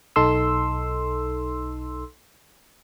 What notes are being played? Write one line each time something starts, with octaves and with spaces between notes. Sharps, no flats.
B1 D#4 A4 C6 E6